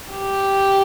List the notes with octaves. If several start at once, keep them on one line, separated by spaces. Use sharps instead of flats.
G4